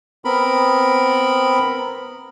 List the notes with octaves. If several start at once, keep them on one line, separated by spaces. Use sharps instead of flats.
B3 C4 A#4 B5